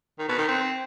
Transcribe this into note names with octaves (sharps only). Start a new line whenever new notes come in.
D#3
B2
D#3
C4